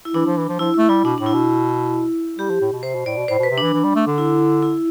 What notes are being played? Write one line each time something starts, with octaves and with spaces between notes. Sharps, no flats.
E4
E3 D4
F3
E3
F3
F3 E4
A3 E4
G3 E4
B2 D4
A2 D4
E4
B2
G3 G4
F3
A2
B2
C3 C5
B2
A2 D5
B2
A2 C5
B2
B4
C3
E3 D4
E3
G3
A3
D3
E4
E4